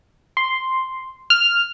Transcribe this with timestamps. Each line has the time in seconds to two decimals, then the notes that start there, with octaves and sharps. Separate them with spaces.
0.37 C6
1.30 F6